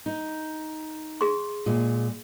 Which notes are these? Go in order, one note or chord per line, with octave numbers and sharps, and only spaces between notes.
D#4
G#4 C6
A#2 G#3